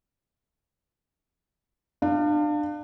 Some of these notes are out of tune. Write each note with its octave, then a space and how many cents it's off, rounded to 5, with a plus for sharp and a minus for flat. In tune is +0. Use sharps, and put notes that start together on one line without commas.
D4 +30 F5 +0